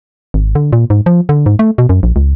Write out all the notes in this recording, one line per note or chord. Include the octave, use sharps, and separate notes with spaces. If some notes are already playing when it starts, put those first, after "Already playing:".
G#1
D3
A#2
G#2
F3
D3
G#2
A3
B2
F#2
A#1
C#2